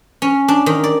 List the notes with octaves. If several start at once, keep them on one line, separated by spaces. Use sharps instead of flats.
C#4
D4
D#3
D5